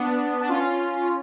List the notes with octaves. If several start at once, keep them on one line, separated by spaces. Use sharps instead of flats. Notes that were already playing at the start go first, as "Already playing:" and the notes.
Already playing: B3 D4
D4
C#4 F4